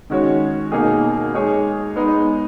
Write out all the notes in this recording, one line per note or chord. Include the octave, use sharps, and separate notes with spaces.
D#3 G#3 C#4 F#4 C#5
B2 A#3 D#4 G#4
G#3 D#4 G#4 C#5
G#3 B3 D#4